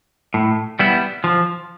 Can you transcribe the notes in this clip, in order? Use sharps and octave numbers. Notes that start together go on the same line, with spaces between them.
A2
G3 B3 E4
F3